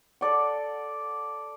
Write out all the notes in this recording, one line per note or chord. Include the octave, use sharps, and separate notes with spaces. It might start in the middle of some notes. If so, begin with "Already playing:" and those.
A4 D5 F#5